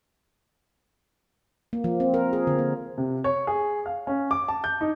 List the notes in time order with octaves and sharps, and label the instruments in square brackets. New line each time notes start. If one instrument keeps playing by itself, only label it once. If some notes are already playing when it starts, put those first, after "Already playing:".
[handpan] A#3
F3
C4
A#4
G#4
D3
A#3
[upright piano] C3
C#5
G#4
F5
C#4
D6
A5
G6
D#4